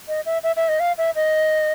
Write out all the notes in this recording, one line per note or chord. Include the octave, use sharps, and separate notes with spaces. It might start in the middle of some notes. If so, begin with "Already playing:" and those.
D#5
E5
E5
E5
D#5
F5
E5
D#5